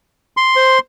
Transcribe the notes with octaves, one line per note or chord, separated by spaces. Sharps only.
C6
C5